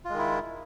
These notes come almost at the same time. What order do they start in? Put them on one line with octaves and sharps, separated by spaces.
F4 G#3 D#3 E4